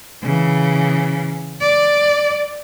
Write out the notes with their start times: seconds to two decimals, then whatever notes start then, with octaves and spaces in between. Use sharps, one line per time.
0.23 C#3 E3
1.61 D5